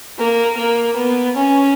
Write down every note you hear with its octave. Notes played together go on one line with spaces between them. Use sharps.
A#3
A#3
B3
C#4